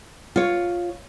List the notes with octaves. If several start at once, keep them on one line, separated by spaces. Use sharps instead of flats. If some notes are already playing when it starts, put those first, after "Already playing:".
F4 C#5